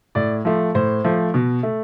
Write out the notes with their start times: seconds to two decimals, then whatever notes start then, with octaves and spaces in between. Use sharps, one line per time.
0.15 A2 D5
0.45 F3 A3
0.75 A2 C5
1.04 F3 A3
1.34 B2
1.63 A3